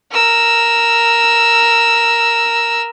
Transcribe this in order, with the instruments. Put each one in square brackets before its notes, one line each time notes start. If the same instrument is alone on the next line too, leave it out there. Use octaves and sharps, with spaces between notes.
[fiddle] A#4 E6